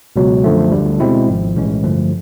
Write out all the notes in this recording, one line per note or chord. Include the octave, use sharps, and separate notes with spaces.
C#2 B2 F#3
F#2 D3 F3 A3
D2 D3 G3
B2 G#3 C4 E4
G#1 G#2 F3
B1 A2 E3 G#3 C#4
G2 D3 F3 A3